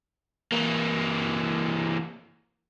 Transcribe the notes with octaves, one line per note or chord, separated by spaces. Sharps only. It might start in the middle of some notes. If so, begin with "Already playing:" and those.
E3 A#3